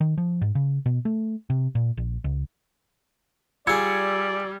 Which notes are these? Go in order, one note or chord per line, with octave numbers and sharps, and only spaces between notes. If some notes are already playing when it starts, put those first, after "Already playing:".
D#3
F3
G#2
C#3
B2
A3
C3
A#2
A#1
C#2
G3 F4 G#4 D5 E6 G#6 C#7